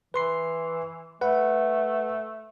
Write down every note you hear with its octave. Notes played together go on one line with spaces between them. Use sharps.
E3 B4 C6 C7
A3 B4 F#5